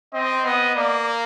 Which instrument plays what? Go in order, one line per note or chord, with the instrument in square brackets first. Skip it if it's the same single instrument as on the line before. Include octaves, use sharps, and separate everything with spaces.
[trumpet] C4 [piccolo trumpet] D#5
[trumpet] B3 [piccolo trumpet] D#5
[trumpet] A#3 [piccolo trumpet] D5